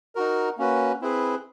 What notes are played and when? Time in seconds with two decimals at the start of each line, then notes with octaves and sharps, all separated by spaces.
0.15 D#4 F#4 A#4
0.57 A#3 C#4 F#4 B4
1.01 C4 E4 G#4 B4